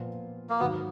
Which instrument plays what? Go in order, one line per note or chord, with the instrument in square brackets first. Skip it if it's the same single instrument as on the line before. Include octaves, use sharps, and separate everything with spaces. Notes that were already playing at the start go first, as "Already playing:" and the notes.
Already playing: [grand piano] A#2 F3 B3 F4
[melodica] A#3
[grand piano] G#2 D#3 F#3 [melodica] B3